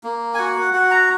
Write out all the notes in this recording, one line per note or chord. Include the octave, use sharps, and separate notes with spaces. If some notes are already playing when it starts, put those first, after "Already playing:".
A#3
G#5
F#4 F#5
F#4 F#5
A#5